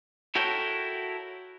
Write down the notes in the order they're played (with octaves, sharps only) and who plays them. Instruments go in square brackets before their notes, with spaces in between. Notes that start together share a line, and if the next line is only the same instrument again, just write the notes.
[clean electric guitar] E4 F#4 A4 A#4 C#5 G5